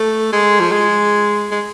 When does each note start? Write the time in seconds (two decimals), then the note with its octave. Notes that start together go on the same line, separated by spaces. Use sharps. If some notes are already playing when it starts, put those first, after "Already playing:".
Already playing: A3
0.33 G#3
0.60 F3
0.72 G#3
1.52 G#3